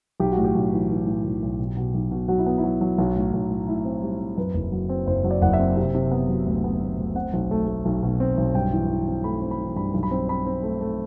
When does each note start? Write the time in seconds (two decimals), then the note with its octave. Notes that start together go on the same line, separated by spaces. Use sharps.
0.20 B1 G4
0.32 F#4
0.37 A2
0.44 G4
0.55 B1
0.72 E3
0.90 E3
1.07 A2
1.24 B1
1.42 B1
1.59 B2
1.77 B2
1.94 B1
2.11 B2
2.28 F#3 F#4
2.38 E4
2.46 B3
2.58 E4
2.63 F#3
2.81 F#3
2.98 B1 F#4
3.16 A2
3.33 B1
3.50 A2
3.68 A2 E4
3.85 C4
4.02 G3
4.20 C4
4.37 F#2 B4
4.54 F#1
4.72 F#3
4.89 C4
5.06 F#1 C5
5.24 F#3
5.31 D5
5.42 F#1 F#5
5.53 E5
5.59 C4
5.76 C3
5.94 C3
6.11 B3
6.29 F#3
6.46 D2
6.64 B3
6.81 D2
6.98 D2
7.15 C4 F#5
7.33 B1
7.51 A3
7.68 A3
7.85 B1
8.03 B2
8.20 C4
8.37 B1
8.55 G2 G5
8.72 E3
8.89 E3
9.07 C4
9.24 A3 B5
9.42 C4
9.51 B5
9.59 E3
9.76 G2 B5
9.94 B1
10.03 B5
10.11 C4
10.29 C4 B5
10.46 C4
10.63 A3
10.81 A3